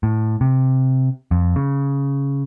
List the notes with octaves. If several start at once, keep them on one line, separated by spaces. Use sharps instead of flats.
A2
C3
F2
C#3